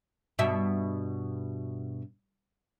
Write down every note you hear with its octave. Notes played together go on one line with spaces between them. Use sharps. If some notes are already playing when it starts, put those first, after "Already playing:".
G2 B2 E5